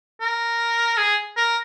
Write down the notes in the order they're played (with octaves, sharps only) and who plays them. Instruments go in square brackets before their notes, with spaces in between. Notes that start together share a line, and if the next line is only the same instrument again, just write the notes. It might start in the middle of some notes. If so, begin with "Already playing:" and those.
[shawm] A#4
G#4
A#4